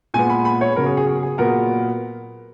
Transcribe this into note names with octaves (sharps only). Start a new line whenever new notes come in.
A#2 G#3 B3 G#5
B5
B5
C#5
C#3 F#3 B3 A#4
G#4
G#4
G#4
G#4
A#2 F#3 B3 A#4